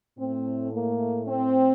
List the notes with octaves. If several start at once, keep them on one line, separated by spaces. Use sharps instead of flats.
A2 A3 C4
A#3
C4